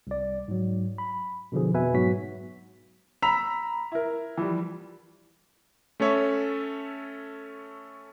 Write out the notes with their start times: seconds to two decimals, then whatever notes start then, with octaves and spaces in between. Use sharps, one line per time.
0.07 C2 D5
0.48 G#2 F#3
0.98 B5
1.52 B2 D3 E3 F3 G#4
1.74 F2 B2 B4 E5 G#5
1.94 G#2 F#3 B3 F#4 B6
3.22 A#5 B5 E6 B6 F7
3.92 E4 A#4
4.37 E3 F3 G3
6.00 A3 C#4 A4 C#5 E5